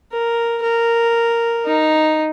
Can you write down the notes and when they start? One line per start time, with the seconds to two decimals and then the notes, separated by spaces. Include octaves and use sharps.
0.12 A#4
0.63 A#4
1.67 D#4